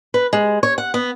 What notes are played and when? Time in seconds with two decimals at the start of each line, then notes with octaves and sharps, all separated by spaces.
0.14 B4
0.33 G#3
0.63 C#5
0.78 F#5
0.94 B3